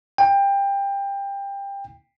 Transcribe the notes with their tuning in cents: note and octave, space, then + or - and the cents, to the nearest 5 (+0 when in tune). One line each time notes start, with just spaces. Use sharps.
G5 +20